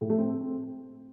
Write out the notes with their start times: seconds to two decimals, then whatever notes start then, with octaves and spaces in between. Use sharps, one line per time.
0.01 A2
0.10 A3
0.18 C4